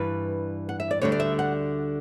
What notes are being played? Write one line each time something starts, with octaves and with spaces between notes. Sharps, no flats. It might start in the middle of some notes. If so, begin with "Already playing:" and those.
Already playing: G2 E3 G3 B4
F#5
E5
D5
D2 D3 G3 C#5
D5
E5
F#5